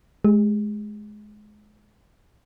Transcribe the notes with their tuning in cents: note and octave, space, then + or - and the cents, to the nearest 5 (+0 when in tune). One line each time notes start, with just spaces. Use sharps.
G#3 +20 G4 +45